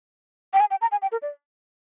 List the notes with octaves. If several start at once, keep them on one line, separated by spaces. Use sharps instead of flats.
G5
G#5
G5
A#5
G#5
G5
A#4
D5